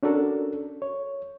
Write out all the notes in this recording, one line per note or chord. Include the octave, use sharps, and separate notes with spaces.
C#4 D4 F#4 A4 A#4
C#5